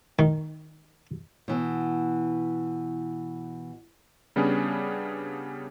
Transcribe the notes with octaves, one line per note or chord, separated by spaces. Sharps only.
D#3
B2 E3
C#3 G3 B3 C#4 D4 G#4